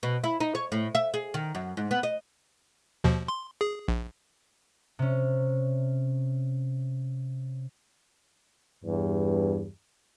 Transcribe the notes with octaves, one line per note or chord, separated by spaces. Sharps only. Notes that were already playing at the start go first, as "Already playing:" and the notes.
B2
E4
D#4
C#5
A2
E5
G#4
D#3
F#2
G#2
B3
D#5
D#2 B2 F3
C6
G#4
A#1
C3 C#4
E2 G2